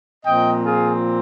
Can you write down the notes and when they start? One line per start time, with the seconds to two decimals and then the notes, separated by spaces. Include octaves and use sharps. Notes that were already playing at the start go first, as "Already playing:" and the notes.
0.25 A#2 F3 C4 D#5 G5
0.64 F4 G#4